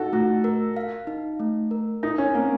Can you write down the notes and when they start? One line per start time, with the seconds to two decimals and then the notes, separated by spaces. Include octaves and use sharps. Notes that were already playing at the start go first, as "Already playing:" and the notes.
Already playing: D#4 F#4 A4
0.13 A3 F#4
0.44 A#4
0.76 F5
1.07 D#4
1.40 A3
1.71 A#4
2.03 D#4 A#4
2.18 C#4
2.34 A#3 C4